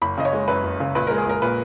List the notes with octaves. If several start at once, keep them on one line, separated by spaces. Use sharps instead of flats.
F#1 B5
C#3 D#5
C#5
G#3
F#2 B4
F#1
C#3
A#1 B4
G#3 A#4
G#4
A#1 A#4
A#2 B4